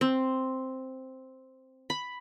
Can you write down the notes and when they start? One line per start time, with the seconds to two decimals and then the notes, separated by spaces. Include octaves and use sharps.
0.01 C4
1.90 B5